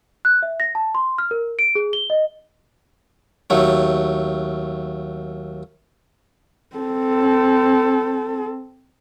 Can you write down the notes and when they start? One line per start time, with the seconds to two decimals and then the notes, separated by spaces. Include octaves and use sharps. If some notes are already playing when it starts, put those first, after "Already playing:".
0.25 F#6
0.42 E5
0.60 A#6
0.75 A5
0.95 C6
1.18 F6
1.31 A#4
1.59 D7
1.75 G#4
1.93 G7
2.10 D#5
3.50 D#2 F#3 A3
6.76 C4 A4